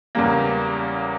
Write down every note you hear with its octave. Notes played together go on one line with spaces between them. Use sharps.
E2 C#3 G3 A#3